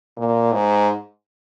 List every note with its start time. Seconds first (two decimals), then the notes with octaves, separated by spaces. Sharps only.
0.17 A#2
0.53 G#2